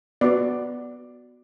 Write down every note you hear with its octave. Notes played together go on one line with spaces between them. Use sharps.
B3 F#4 D5